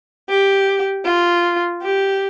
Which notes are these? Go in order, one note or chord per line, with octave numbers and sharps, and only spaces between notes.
G4
F4
G4